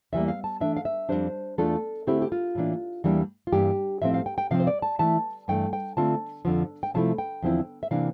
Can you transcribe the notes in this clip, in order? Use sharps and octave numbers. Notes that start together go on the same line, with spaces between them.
E2 E3 G3 A#3 E5
F5
A5
E3 A3 D4 E5
F5
E5
F2 E3 G3 D4 C5
E2 E3 A3 D4 F4 A4
D3 A3 C4 E4 G4
G4
F4
A2 E3 A#3 D4
E2 E3 G3 A#3 D4
F4
G2 E3 A#3 G4
A2 F3 C4 E5
F5
G5
G5
C3 F3 C4 F5
C5
D5
A5
E3 A3 E4 A5
G2 E3 A3 G5
G5
D3 A3 C4 F4 A5
F2 D3 F3
G5
C3 F3 A3 E4 A5
G5
E2 D3 F3 C4 E4
E5
C3 E3 A#3 D4 F5